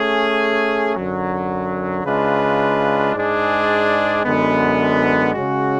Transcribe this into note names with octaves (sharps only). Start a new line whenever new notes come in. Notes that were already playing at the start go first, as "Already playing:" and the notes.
Already playing: A3 C#4 G#4
F#2 D3 F#3
C#3 G#3 D4 F4 B4
G#2 G#3 D4 G#4 D5
F#2 D3 G#3 B3
C#3 G#3 C#4 F#4